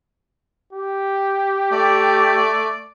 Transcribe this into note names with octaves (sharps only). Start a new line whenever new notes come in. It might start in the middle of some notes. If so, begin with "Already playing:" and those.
G4
A3 D5